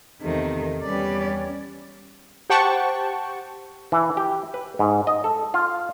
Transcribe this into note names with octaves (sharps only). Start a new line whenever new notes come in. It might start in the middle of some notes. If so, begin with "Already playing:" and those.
E2 C3 D#3 A3
E2 G3 C#4 B4 D5
G4 C5 F#5 G5 A5 C#6
E3
G4
B4
G#2
D#5
A4
F4